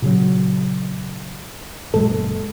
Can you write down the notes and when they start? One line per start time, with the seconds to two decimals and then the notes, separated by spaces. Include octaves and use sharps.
0.02 A#2 C#3 F#3
1.94 F#1 A#2 G#3 A4